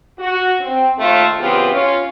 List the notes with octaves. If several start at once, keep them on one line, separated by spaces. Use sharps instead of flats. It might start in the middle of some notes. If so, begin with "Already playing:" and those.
F#4
C4
D#2 A3 F4
C#3 E3 B3 C4 F4 G4
C#4 F4